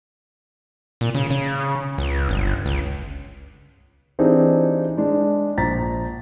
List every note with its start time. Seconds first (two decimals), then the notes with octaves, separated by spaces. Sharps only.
1.01 A#2
1.15 C#3
1.30 C#3
1.98 C#2
2.29 G1
2.65 C#2
4.19 E3 C4 D4 D#4 G4 G#4
4.97 G#3 D4
5.57 A#1 A#5 A6 B6